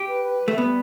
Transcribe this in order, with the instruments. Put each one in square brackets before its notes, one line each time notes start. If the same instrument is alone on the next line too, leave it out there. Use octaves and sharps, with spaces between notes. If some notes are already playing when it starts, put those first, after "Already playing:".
Already playing: [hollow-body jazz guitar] G4
[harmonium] B4
B4
G3
[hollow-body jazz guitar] A3
[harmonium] G3 [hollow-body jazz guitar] B3